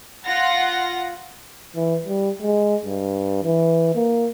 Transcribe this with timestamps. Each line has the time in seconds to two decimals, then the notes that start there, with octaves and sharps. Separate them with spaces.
0.24 F4 F#5 A#6
1.76 E3
2.05 G3
2.42 G#3
2.85 G2
3.43 E3
3.95 A#3